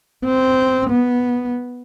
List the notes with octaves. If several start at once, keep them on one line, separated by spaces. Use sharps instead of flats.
C4
B3